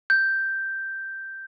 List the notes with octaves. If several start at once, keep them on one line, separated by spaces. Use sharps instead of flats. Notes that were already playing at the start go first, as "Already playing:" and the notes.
G6